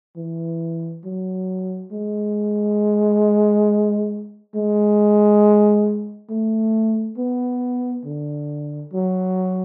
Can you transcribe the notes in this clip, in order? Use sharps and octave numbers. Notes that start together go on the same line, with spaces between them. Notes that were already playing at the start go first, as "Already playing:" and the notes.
E3
F#3
G#3
G#3
A3
B3
D3
F#3